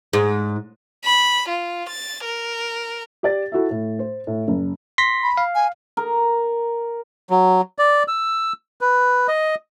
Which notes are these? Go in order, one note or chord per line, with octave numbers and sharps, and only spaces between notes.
G#2
B5
F4
A6
A#4
G4 D5 A6
E4 F#4 A4 E5
A2
C5
A2
F#1
C6 A#6 B6
B5
F5
G#5
A#4
F#3
D5
E6
B4
D#5